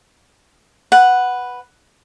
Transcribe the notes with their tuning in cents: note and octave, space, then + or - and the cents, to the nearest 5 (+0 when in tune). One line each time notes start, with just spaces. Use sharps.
B4 +0 F#5 +0